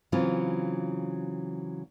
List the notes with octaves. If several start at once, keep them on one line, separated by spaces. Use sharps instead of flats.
C#3 E3 F#3 C4 F4